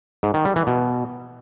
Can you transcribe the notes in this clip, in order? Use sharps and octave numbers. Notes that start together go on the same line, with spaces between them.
G#2
D#3
G3
E3
B2